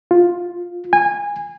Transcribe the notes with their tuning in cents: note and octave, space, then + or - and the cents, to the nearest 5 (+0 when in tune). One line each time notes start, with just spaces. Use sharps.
F4 +10
G#5 -20